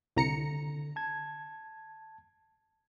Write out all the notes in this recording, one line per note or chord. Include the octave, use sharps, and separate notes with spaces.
C2 D3 A#5 C#7
A5 G#6